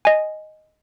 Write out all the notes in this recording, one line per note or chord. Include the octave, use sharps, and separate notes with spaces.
D#5 G#5